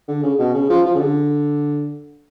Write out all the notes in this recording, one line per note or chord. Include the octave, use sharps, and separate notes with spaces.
D3
C#3
B2
C#3
F3
F3
C#3
D3